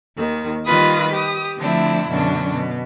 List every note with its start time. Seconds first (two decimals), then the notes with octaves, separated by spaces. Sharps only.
0.17 D#2 D#3
0.64 D#3 G3 F4 B4 B5 D#6
1.12 G4 D#6
1.58 D3 F3 A3 C4 D4 E4
2.09 F#2 B2 D3 C#4 D4
2.52 B2